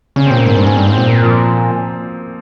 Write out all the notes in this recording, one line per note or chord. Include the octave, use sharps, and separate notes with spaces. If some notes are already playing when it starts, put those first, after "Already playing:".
C#3 C#4
C4
A#2
A#3
G#2 C4
G2
C#4
G#2
G2 C4
G#2
C4
A#2
A#3
F3